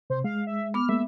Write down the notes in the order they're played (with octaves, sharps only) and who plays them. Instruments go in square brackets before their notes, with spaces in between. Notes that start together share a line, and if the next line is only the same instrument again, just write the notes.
[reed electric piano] C3 [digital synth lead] C5
[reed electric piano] G#3 [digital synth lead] F5
[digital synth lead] E5
[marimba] B3 D6 [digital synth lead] F6
[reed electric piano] G#3 A#3 [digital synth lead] E5